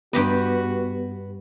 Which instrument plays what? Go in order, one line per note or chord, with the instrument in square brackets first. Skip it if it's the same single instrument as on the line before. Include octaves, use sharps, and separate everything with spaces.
[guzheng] G2 G4 D#5 [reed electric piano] B3 [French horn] F#4 [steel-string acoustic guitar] B4